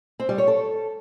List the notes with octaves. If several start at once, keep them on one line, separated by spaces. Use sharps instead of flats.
C4
G3
C#5
A4